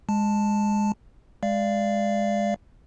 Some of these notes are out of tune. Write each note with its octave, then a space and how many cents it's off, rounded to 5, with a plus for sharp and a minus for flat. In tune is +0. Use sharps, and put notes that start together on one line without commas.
G#3 -10 A5 +0
G#3 -10 D5 +0 F5 -25